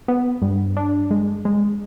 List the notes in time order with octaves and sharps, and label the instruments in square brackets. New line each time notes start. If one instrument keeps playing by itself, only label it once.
[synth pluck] B3
G2
D4
G#3
G#3